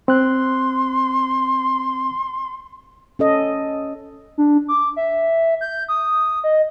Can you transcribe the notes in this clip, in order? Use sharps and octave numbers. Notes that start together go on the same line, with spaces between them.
C4 C6 F#6
C#4 A4 D#5
D4
D6
E5
G6
D#6
D#5